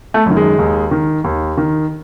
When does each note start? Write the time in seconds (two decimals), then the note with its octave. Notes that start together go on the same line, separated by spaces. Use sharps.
0.14 A3
0.26 F#2 D#3
0.37 G#3
0.59 D#2
0.91 D#3
1.24 D#2
1.57 D#3